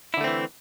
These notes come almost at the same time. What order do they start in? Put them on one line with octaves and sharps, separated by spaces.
E4 D3 A3 C4 E3